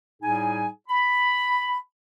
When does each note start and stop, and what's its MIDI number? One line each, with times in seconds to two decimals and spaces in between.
0.23 0.68 45
0.23 0.68 55
0.23 0.68 63
0.23 0.68 68
0.23 0.68 80
0.89 1.77 83